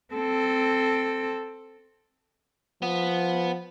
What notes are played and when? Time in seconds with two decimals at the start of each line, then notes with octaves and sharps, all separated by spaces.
0.14 C4 A4
2.82 F3 B3